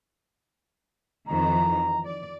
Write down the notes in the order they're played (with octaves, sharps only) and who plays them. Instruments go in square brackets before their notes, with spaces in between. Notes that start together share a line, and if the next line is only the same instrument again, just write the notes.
[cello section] F2 D#3 E3 [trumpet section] A#5
[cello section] D5